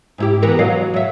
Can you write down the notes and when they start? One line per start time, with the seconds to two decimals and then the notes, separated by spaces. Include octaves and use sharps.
0.18 G#2 E4 G4
0.42 E3 B3 A#4
0.59 F#3 D#5 F5
0.94 F#3 E5